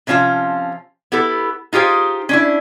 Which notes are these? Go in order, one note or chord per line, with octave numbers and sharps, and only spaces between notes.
C3 F3 C#4 F4 A5
B3 E4 G4 A4
D#4 F4 G4 G#4 C5
C#4 D4 E4